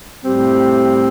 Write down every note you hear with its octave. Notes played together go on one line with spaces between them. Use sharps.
A2 G3 C4 G4